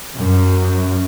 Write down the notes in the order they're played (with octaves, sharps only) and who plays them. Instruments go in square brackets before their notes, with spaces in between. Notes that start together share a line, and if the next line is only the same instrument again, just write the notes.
[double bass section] F#2